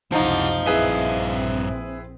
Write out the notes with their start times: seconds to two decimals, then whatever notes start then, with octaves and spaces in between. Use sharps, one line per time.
0.12 F#1 C#2 C3 F3 D#4 E4 F#5
0.66 A#1 G2 C4 E4 G#4 B4 E5